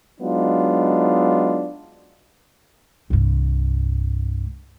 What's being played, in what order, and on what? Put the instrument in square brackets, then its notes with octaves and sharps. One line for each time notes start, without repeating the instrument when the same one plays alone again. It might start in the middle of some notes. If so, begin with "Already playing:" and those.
[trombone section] F#3 G#3 B3 D4 D#4 F4
[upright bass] C2 G2